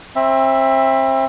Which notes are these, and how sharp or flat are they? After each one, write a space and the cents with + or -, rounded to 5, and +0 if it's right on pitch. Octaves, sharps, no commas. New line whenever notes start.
C4 +30 E5 +0 B5 +0